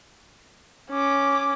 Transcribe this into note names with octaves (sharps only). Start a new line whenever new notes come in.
C#4 D6